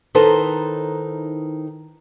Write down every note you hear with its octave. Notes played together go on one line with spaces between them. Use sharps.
D#3 D#4 E4 A4 B4 C5